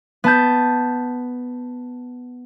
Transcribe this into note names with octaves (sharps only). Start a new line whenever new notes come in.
B3 A5 G6